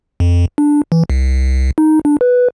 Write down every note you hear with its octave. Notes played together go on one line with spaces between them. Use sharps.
F2
D4
E3
C2
D#4
D4
B4